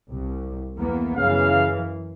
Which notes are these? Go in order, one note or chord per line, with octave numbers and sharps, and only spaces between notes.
C2
E2 A#3 B3
F#2 C#3 E3 F5